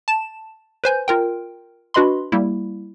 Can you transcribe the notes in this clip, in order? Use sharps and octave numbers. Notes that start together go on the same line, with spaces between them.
A5 E7
B4 C5 G#5 G6
F4 A#4 G5
D4 F#4 B4 D#5 B5 C6
G3 A#3 E4